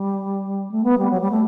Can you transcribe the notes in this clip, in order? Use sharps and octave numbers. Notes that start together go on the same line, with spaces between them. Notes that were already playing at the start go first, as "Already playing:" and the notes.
Already playing: G3
A3
B3
G3
F#3
G3
A3